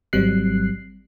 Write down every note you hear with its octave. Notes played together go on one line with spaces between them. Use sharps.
G#1 F#3 G3 C4 F#6 C7